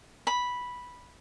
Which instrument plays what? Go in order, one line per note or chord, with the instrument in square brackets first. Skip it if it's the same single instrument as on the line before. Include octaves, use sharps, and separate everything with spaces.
[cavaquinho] B5